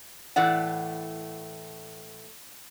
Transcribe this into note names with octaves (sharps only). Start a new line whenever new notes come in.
A2 E3 A3 D5 F#5